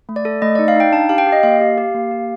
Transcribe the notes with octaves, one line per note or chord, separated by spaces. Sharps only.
A3
D5
A4
A3 D#5
D#4 D5
F5
D#4 G5
D4 A5
G4 F5
G5
G4
D#5
A#3 F5
G4
G4
A#3
G4